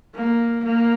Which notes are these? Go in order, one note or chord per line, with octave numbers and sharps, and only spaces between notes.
A#3
A#3